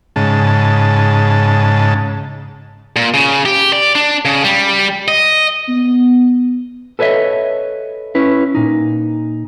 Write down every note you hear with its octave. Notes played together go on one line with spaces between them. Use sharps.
G#2 C#3 A5
A#2
C#3
G4
D5
D4
C#3
G3
D#5
B3
A4 B4 C#5 D#5 E5
C#4 E4 B4
A#2 D#4